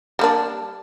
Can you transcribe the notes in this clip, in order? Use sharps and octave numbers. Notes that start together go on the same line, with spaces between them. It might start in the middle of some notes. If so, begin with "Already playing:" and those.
G3 A#3 D4